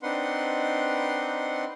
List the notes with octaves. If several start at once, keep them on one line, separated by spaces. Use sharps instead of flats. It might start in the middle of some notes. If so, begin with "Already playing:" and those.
C4 D4 D#4 B4 F#5 C6